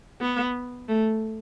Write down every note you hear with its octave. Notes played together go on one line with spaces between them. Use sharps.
B3
A3